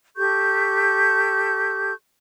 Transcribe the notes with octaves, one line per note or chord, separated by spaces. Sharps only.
G4 A4 C#6 G6